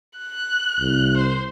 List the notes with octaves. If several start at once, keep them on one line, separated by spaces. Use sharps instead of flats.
F#6
C2
C5